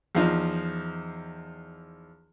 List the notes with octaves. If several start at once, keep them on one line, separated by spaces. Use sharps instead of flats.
E2 F3 D#4